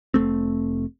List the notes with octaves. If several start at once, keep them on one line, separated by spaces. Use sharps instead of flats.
F1 F2 A3 C4